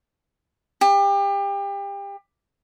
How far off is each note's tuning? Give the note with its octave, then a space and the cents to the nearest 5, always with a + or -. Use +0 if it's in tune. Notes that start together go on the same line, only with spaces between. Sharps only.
G4 +30